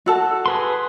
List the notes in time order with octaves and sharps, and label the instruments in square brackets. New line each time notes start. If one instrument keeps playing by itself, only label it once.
[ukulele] F#4 A4 A5
[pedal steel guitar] G#4 B4 C6